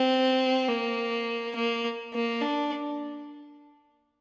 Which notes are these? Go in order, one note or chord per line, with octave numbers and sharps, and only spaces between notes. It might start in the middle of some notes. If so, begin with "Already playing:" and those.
Already playing: C4
A#3
A#3
A#3
D4